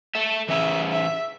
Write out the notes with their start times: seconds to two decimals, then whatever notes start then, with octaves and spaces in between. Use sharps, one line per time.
0.15 A4 E5
0.48 E3 C#4 G#4 E5
0.92 E5